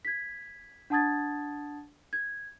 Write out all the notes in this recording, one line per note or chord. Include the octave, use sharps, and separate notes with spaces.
G#6 B6
D4 F#5 A5 D#6 G#6 A6
G#6